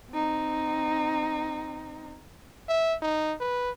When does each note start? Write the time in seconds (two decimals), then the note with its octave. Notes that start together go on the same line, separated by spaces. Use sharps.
0.11 C4 D#4
2.69 E5
3.02 D#4
3.40 B4